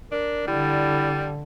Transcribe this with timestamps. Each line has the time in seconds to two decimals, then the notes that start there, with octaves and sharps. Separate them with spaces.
0.12 D4 A#4
0.48 D3 G3 E4